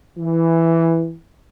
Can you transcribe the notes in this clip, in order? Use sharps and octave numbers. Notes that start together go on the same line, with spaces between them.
E3